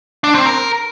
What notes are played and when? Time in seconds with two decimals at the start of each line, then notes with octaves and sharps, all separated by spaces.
0.24 D4
0.35 C4
0.46 A#4